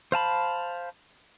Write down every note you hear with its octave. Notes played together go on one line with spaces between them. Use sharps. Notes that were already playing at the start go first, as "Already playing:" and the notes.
C5 F5 A5 B5